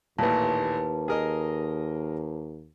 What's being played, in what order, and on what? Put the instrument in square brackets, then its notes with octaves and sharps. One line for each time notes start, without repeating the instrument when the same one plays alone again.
[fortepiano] A1 A#2 [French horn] D#2 [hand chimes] B4 A5
[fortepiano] G#4 A#4 D#5